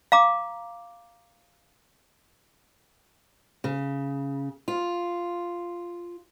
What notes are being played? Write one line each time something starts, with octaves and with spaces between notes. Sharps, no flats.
F5 A#5 D6
C#3
F4